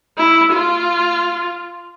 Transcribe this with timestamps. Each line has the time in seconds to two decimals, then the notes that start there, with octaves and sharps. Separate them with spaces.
0.18 E4
0.52 F4